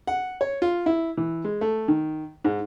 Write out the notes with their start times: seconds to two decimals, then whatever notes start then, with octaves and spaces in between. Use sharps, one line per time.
0.07 F#5
0.41 C#5
0.62 F4
0.86 E4
1.17 E3
1.44 G#3
1.61 A3
1.88 D#3
2.44 G#2